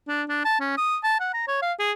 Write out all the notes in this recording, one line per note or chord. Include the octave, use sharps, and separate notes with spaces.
D4
D4
A5
C#4
D#6
A5
F#5
A#5
C#5
F5
G#4